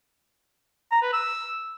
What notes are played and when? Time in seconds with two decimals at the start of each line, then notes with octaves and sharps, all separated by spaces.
0.91 A#5
1.02 B4
1.13 E6